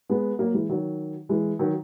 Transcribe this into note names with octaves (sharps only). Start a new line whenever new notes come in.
G#3 B3
F#3 A#3
E3 G#3
D#3 F#3
E3 G#3
D#3 F#3